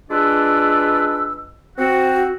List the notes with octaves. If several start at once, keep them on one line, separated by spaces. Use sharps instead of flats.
G#3 D4 F4 B4 D5 E6
C4 F#4